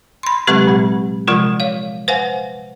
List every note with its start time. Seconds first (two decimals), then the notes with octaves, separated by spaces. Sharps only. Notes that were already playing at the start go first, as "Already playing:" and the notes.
0.23 B5 C6
0.47 C3 F#3 G#3 C4 G4 B4
0.67 A#2 G#3
1.28 C3 F3 G#3 F4 A#4
1.60 C#5 F5
2.08 B4 C5 F5 F#5 G#5